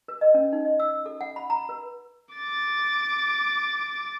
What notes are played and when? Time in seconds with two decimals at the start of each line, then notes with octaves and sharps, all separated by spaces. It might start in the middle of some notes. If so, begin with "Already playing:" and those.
0.08 B4
0.21 D#5
0.34 C#4
0.53 D#4
0.65 D#5
0.80 E6
1.06 A4
1.21 F#5
1.36 B5
1.50 A#5
1.69 B4
2.35 D6 A6